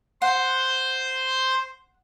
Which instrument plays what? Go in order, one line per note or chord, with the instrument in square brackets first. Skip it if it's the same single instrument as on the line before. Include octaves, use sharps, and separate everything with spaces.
[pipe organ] C5 C6 [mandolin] F#5